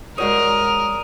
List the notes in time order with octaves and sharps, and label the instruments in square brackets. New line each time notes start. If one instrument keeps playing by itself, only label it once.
[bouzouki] G3 [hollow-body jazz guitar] G#3 F#4 C#5 [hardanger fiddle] A#4 [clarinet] D#6